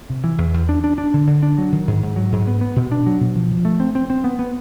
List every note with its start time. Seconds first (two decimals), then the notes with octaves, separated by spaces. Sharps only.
0.10 C3
0.24 E3
0.38 E2
0.54 E2
0.69 D4
0.84 D4
0.98 D4
1.14 D3
1.27 D3
1.43 D4
1.58 F#3
1.72 D#3
1.87 G#2
2.02 G#2
2.16 F#3
2.32 G#2
2.47 B3
2.61 B3
2.76 B2
2.92 D4
3.06 F#3
3.21 B2
3.35 F3
3.51 F3
3.65 A3
3.80 C4
3.95 C4
4.10 C4
4.24 B3
4.39 B3